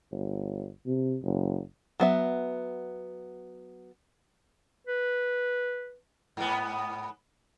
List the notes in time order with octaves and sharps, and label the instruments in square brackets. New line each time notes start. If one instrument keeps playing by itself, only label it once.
[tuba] G1
C3
F#1
[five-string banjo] F#3 B3 E5
[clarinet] B4
[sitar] G#2 B3